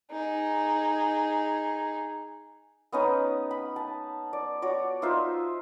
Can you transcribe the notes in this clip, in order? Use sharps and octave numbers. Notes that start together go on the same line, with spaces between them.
D#4 G#4
B3 C#4 D#4
B5
A5
D5
F#4 C#5 D5
D#4 F4 C5 E5